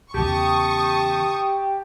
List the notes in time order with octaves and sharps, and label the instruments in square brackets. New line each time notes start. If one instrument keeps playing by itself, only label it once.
[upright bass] E2 C#3 [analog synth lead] G4 [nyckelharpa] A5 [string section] C#6 D#6